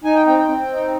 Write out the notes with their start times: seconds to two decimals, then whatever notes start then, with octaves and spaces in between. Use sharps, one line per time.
0.04 D#4 G#5
0.15 G5
0.26 C4 G5
0.38 G5
0.48 C4
0.71 D#4